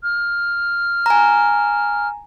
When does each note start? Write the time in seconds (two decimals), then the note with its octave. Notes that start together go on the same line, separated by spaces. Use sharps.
0.03 F6
1.06 G#5 A#5